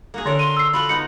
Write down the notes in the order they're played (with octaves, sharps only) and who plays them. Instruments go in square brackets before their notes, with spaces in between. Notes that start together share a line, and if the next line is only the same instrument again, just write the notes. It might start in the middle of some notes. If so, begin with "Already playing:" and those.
[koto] A#3 F#4 G#4
[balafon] D3 C#5 [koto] D4 A4 A#4
[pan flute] C6 [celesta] D#7
[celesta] E6 C7
[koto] F4 F#4 A4 [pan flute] B5
[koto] B3 D#4 [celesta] C#7